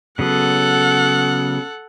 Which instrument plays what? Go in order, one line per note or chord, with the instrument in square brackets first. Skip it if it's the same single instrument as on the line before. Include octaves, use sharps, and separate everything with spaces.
[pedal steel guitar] C#3 F#3 B3 [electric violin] A4 F#5